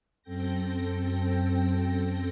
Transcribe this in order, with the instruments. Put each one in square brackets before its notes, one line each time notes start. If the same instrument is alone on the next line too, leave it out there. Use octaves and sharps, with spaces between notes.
[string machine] F#2 C4 A4 G5 G6 A#6